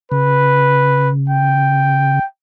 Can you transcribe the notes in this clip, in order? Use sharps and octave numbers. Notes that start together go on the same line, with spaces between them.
C#3 B4
G5